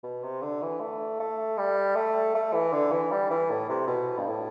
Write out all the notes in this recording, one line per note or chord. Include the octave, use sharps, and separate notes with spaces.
B2
C3
D3
E3
A3
A3
G3
A3
A3
E3
D3
E3
G3
E3
A2
C3
B2
G2
A2